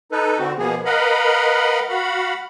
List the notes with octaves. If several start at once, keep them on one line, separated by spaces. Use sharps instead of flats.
D#4 A4 B4
D3 C4 F#4
B2 F3 A#3 B3 G#4
A#4 B4 D#5 F5 F#5 B5
F#4 F5 F#5 B5